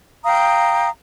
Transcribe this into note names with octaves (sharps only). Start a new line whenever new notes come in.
F5 G5 A#5 D#6